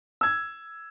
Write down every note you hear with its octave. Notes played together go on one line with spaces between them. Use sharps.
E6 G#6